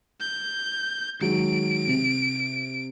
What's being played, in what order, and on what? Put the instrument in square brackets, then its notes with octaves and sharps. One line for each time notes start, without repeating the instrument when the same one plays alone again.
[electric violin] G6
[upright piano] D#3 F#3 G#3 [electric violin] D7
[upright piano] C3